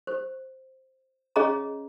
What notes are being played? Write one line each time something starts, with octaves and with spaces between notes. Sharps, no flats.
C5
C#4 G#4 C#5 D#5 F5 A#5